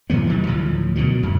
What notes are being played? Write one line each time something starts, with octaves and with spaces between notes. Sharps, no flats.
A2 E3 F#3 B3
E1 D#3 F#3 G3
D2 A2 F3
B2 D3 D#3 F#3
F#2